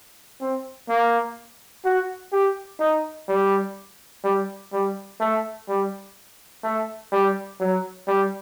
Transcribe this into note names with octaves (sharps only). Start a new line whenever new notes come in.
C4
A#3
F#4
G4
D#4
G3
G3
G3
A3
G3
A3
G3
F#3
G3